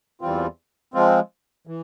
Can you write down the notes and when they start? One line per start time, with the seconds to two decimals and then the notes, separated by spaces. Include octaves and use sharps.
0.21 E2 E3 G3 C4 F4
0.94 F3 G#3 C4 F4
1.67 E3